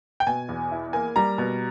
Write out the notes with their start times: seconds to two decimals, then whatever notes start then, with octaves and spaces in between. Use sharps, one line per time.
0.20 G5
0.27 B2 G#5
0.49 E2
0.71 E4
0.93 A#3 G#5
1.16 G3 A#5
1.38 B2